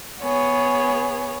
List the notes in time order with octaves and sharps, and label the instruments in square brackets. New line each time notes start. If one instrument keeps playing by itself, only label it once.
[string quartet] B3 G#4 C#5